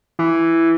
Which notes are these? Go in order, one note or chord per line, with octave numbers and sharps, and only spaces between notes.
E3